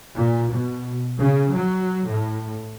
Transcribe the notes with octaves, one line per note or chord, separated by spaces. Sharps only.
A#2
B2
C#3
F#3
A2